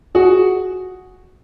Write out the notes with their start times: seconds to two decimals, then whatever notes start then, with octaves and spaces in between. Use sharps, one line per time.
0.15 F#4 G#4